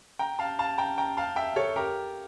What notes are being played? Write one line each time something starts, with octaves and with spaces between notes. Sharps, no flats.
G5 A#5
F5 A5
F5 A5
G5 A#5
G5 A#5
F5 A5
E5 G5
A4 C#5
G4 A#4